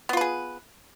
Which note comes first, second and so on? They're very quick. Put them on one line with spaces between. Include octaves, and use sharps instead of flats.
B3 F4 B4 G#4